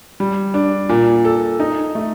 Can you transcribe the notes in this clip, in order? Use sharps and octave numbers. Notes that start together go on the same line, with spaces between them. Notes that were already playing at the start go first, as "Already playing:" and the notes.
G3
D4
A#2
A4
D#4
A3